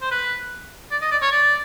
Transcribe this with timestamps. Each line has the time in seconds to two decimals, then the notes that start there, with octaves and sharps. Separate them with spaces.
0.01 C5
0.11 B4
0.91 D5
1.02 D#5
1.11 D5
1.22 C#5
1.31 D5